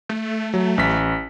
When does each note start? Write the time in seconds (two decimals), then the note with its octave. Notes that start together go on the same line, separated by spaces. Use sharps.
0.09 A3
0.54 F#3
0.78 A1 B6